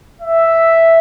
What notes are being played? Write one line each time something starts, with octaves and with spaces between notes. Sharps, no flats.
E5